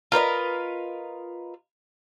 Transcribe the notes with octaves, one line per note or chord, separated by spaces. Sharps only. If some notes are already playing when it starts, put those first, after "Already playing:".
F4 A#4 B4 D#5